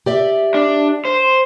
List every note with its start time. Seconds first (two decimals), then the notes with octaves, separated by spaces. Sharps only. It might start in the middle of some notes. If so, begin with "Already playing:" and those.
0.06 G4 D5 E5
0.54 D4
1.05 C5